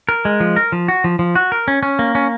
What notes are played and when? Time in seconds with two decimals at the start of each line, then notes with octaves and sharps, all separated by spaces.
0.09 A#4
0.25 G#3
0.40 F3
0.56 A#4
0.72 F3
0.88 F#4
1.04 F3
1.19 F3
1.35 F#4
1.52 A#4
1.68 C#4
1.83 C#4
1.99 A#3
2.15 C#4